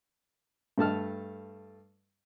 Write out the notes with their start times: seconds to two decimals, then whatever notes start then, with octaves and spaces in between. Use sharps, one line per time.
0.78 G2 A3 A5 F6